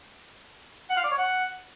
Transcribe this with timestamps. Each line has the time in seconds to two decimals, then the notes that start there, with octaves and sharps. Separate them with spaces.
0.90 F#5
0.97 F5
1.04 D5
1.11 C#5
1.18 F#5